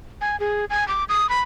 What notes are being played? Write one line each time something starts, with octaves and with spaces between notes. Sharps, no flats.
G#5
G#4
G#5
D6
D#6
B5